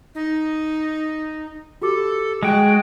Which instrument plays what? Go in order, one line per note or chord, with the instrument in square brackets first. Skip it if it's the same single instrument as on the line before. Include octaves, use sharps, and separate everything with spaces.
[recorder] D#4
[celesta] F#4 G4 D6 [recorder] A4
[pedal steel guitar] G#3 G5 [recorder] F#4